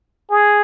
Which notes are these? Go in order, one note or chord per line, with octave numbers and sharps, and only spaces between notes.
G#4